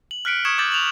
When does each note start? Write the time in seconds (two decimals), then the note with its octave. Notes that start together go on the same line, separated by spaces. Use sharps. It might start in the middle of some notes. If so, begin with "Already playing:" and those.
0.11 F#7
0.25 F6 F#6 B6 C#7 D7 F#7
0.45 C#6 D#6 G#6 C#7 E7
0.58 D6 G6 A6 F#7
0.72 F7 F#7